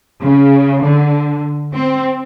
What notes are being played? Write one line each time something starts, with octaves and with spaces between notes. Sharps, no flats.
C#3
D3
C4